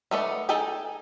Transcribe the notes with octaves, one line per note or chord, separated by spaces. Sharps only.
D#3 A3 B3 D5
D#4 G#4 A4 G5 G#5